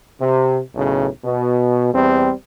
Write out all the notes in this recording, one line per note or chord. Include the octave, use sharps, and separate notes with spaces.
C3
B1 A2 C#3
B2
E2 G3 C4